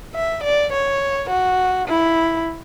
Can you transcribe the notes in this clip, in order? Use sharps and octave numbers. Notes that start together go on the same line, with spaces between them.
E5
D5
C#5
F#4
E4